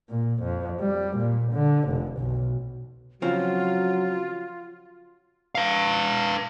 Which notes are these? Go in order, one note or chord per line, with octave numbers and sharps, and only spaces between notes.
A#2
F2
G3
A#2
D3
F1
B1
C#3 F3 F#3 C4 F4
B4 F5